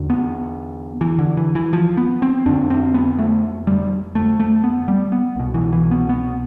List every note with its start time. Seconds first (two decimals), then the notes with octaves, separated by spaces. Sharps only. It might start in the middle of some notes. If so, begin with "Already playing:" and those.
Already playing: E2 D3
0.10 B3
1.01 E3
1.19 D3
1.37 E3
1.55 E3
1.73 F3
1.97 B3
2.22 C4
2.46 F2 D3 D4
2.70 C4
2.94 B3
3.19 A3
3.67 G3
4.15 A3
4.40 A3
4.64 B3
4.88 G3
5.12 B3
5.36 C2 B2
5.54 E3
5.73 E3
5.91 B3
6.09 B3